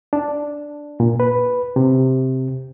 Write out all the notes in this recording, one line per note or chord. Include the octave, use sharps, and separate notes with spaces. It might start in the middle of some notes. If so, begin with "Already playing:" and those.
D4
A#2
B4
C3